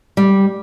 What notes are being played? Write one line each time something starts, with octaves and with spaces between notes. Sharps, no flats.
G3